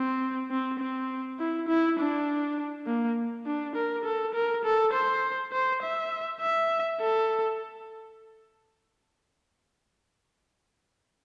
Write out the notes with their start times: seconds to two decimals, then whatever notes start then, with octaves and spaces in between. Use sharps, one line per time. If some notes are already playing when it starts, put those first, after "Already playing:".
Already playing: C4
0.51 C4
0.80 C4
1.39 E4
1.68 E4
1.98 D4
2.86 A#3
3.46 D4
3.75 A#4
4.05 A4
4.34 A#4
4.64 A4
4.93 C5
5.52 C5
5.82 E5
6.40 E5
7.00 A4